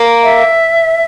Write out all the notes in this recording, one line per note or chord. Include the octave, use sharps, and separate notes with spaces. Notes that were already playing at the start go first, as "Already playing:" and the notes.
Already playing: A#3
E5